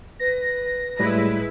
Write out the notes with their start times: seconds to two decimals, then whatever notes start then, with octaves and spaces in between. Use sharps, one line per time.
0.19 B4 A#6
1.00 A2 G3 G#3 E4 B4